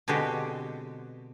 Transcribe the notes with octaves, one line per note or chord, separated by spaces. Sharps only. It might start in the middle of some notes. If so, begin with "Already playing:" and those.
B2 D3 G#3 C4 F#4 G4